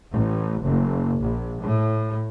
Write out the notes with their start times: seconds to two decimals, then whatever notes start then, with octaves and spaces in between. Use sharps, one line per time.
0.11 A1
0.64 F#1
1.21 A#1
1.62 A2